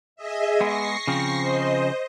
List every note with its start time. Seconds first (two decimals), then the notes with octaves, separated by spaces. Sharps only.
0.16 G#4 D#5 E5
0.60 G#3 B3 C#6 A#6 C7
1.07 C#3 F3 C4
1.40 C5 D#5